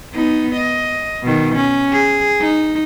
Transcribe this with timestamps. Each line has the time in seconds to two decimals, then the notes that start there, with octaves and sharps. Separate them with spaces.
0.15 B3 D#4
0.56 D#5
1.23 B2 D#3
1.56 C#4
1.93 G#4
2.41 D#4